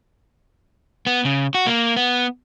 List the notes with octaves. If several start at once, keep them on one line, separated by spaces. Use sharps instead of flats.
B3
C#3
F#4
A#3
B3